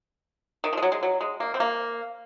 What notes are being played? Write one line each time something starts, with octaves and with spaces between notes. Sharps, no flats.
D#3
F3
G#3
F#3
G#3
F#3
G#3
A#3
C4
A#3